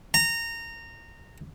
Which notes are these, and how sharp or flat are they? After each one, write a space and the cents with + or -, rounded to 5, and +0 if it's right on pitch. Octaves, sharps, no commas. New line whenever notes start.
A#5 -20